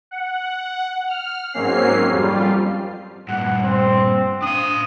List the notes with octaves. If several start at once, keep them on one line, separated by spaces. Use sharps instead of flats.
F#5
F6
G#2 F#3 A#3 C4 C#4 C7
F2 G3 F4
G2 A#2 F#5
C4
D4 F5 D#6